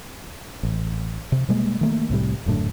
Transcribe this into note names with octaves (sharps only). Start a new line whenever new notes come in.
A1
C3
B2 G3 G#3 A#3
D#3 A3 A#3
C2 A2 C3 G3
D#1 F#2 A2 D3